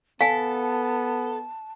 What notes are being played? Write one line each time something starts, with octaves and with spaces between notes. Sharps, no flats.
B3 A4 F5 G#5 A5